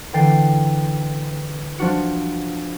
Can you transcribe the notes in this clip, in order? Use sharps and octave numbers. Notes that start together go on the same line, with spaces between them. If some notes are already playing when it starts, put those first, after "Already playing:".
D3 E3 G5 A6 C7
F3 D4 F#4 C#7